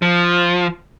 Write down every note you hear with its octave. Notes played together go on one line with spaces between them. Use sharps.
F3